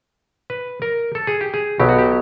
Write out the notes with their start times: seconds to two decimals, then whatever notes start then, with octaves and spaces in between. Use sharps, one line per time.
0.50 B4
0.82 A#4
1.15 A4
1.27 G#4
1.41 G4
1.54 G#4
1.79 B1 B2 F#3 G4
1.89 F#4
1.98 G4